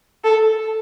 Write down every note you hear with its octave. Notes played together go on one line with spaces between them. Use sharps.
A4